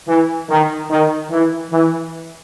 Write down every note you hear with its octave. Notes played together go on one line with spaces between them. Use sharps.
E3
D#3
D#3
E3
E3